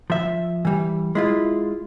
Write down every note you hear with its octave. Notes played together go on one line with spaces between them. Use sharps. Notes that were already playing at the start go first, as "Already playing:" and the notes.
F3 E5
E3 G3
G#3 E4 F4